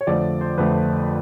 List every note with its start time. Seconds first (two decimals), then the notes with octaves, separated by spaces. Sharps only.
0.01 C#5
0.07 F2 D3 F3 A3 D5
0.41 C5
0.58 F2 D3 F3 A3 B4